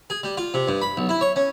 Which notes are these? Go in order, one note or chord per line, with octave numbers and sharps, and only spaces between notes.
G#4
G3
F4
C3
G2
B5
B1
E4
C#5
C#4